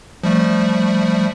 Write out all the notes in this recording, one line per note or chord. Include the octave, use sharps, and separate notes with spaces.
F3 G3 A3